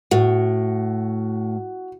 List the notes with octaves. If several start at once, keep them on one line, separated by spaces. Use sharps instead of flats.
A2 F#4